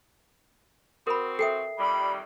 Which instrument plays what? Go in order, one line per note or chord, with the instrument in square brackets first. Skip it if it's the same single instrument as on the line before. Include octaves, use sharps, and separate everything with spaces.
[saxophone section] C4 F#4 [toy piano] A#4 B5 [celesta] D#6
[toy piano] A4 G5 D#6 [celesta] E5 C7
[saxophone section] F2 D#3 G3 [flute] B5